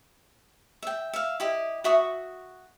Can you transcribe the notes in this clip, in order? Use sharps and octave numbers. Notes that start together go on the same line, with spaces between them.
E5 G5
E5 F5
E4 G4 D#5
F#4 E5 C#6 D#6